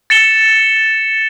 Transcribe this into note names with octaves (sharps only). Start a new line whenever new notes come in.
A6 C#7 E7 G7